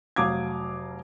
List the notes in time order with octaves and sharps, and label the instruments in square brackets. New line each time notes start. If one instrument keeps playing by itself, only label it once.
[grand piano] F1 F#3 F5 D6 D#6 G#6